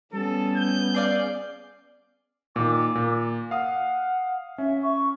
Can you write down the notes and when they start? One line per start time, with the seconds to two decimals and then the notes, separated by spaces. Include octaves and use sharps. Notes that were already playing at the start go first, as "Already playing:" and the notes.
0.13 G3 B3 C#4 A4
0.56 G6
0.94 G#4 D5 F5
2.56 A#2 D#3 D6
2.95 A#2
3.51 F5 F#5 D#6
4.58 C#4 E5
4.83 C#6